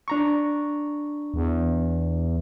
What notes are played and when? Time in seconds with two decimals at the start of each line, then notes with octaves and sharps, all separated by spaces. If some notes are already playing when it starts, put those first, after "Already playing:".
0.08 D4 A#5 C#6
1.34 E2